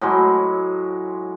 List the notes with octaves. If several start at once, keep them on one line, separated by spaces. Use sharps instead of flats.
A2 F#3 G#3 C6